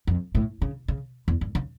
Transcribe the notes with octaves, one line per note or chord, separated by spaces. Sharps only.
F2
A2
C#3
C#3
E2
G2
C#3